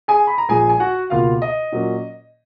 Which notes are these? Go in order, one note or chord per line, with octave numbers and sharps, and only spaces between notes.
G#4 G#5
B5
A#5
A#1 A#2 G#3 G#4 G#5
G#5
F#4 F#5
C#2 B2 A#3 F4 F5
D#5
A#2 F#3 A#3 C#4